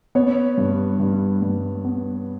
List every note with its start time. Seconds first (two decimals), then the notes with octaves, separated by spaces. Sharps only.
0.15 B3 C#5
0.58 G2
1.00 G2
1.42 G2
1.85 B3